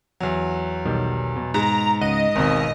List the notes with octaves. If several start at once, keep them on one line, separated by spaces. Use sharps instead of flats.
E2 F#3
B1 D#3 G3
B2
G#2 A#5
C#2 D#5 F#5
G#1 D#2 B2 C4 A#5